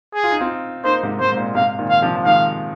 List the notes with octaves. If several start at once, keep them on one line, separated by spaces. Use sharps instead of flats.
G#4
F4
D#4
C4 F4
A#3 D#4 C5
G#2 C3
G#2 C5
G#2
A#2
G#2 C3 F5
A#2 D#3
F5
C3 F3
F3
D#3 G#3 F5